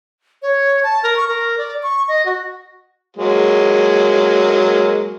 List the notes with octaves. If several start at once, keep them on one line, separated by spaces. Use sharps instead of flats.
C#5
A5
A#4
C#6
A#4
D5
C#6
D#5
F#4
F#3 G#3 A#3